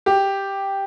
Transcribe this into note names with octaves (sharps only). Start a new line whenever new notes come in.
G4